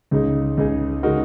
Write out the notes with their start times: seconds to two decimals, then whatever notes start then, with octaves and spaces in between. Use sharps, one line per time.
0.11 C#2 C#3 G#3 D#4 G#4
0.57 C#2 C#3 G#3 D#4 G#4
1.03 C#3 G#3 D#4 F#4 A#4